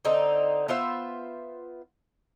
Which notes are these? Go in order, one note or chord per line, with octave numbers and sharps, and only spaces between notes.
D3 C4 D#4
B3 F4 C5 E5